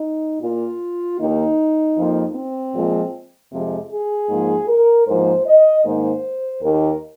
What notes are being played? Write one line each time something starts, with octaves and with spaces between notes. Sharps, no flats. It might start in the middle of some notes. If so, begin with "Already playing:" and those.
Already playing: D#4
A#2 A#3 F4
D#2 D#3 A#3 D#4
F2 F3 A#3
C4
A#2 F3 G#3
F2 C3 F3 G#3
G#4
G#2 F3 A#3
A#4
G#2 F3 A#3 C5
D#5
G#2 D#3 A#3 C5
D#2 D#3 A#3 A#4